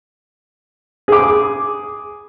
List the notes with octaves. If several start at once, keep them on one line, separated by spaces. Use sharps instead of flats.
G#4 D6